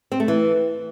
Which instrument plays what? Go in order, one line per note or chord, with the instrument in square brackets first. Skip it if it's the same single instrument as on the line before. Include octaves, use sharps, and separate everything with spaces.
[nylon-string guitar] C4
A3
E3